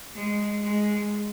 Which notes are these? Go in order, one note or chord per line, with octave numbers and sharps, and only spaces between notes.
G#3
G#3